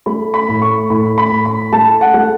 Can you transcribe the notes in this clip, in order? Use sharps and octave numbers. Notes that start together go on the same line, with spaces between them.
A3 B5
B5
A2
C#6
A2 B5
B5
A2
B5
A3 A5
F#5
A3